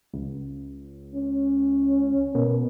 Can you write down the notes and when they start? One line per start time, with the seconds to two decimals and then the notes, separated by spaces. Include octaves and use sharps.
0.14 C#2
1.15 C#4
2.35 B2 A#4